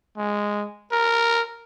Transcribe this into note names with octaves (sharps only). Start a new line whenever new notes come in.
G#3
A#4